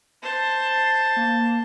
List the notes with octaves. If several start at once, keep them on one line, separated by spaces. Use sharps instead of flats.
C5 A5
C7
A#3